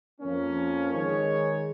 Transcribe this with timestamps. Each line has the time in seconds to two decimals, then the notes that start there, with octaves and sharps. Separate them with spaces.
0.21 F2 F3 A#3 C#4
0.90 D#3 G#3 D#4 G#4 C#5